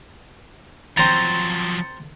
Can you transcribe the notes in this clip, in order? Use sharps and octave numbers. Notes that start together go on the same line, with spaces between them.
F3 F#3 C4 A#5 A6